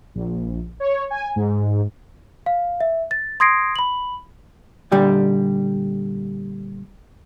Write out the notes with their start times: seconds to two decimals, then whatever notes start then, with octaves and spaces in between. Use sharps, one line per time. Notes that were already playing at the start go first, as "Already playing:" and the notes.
0.15 A#1
0.80 C#5
1.11 G#5
1.36 G#2
2.46 F5
2.81 E5
3.11 A6
3.40 C6 D#6 G#6 A#6 C7 D7
3.76 B5 F#7
4.92 A#2 D3 G3 G4